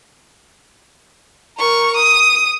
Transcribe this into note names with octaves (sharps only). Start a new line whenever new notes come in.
A#4 C#6
D#6